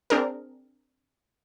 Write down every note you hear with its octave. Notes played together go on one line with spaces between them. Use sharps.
C4 D4 G#4 A#4